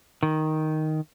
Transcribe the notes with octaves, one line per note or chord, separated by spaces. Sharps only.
D#3